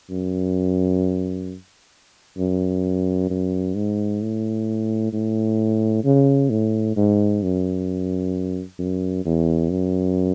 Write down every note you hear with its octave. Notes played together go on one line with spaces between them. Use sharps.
F#2
F#2
F#2
G#2
A2
A2
C#3
A2
G#2
F#2
F#2
E2
F#2